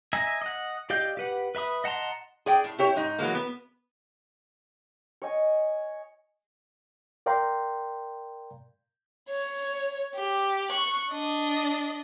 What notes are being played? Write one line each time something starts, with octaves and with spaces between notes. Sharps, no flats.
D#5 E5 G#5 A#5
D#5 F#5
G4 D5 D#5 F5 G6
G4 B4 F#5
B4 E5 B5 D#6
D#5 F#5 A5 A#5 C6
G#4 D5 G5
A2
E4 G4 C#5
G#2 D#4
E3 F#3 G#3 A#3
B3
C#5 D#5 G#5
A#4 D5 F5 G5 A#5 C6
C#5
G4
C#6 F#6
D4 D#5